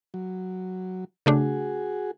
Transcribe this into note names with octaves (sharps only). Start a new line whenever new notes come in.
F#3
C#3 A3 D4 F#4 G#4